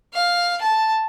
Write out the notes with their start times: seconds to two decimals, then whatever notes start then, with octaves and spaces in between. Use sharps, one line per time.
0.14 F5
0.61 A5